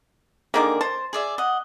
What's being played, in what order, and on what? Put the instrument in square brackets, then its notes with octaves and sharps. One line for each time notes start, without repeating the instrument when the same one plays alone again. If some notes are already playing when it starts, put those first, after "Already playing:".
[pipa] D3 D#3 A#3 [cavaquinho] G#4 A#4 D6
[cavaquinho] C5 [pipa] A5
[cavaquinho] G#4 D5 E5
D#5 F#5